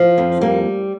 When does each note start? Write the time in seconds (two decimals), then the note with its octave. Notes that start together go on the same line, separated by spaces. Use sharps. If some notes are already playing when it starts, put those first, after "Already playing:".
Already playing: F3
0.18 F2
0.41 G3 A#3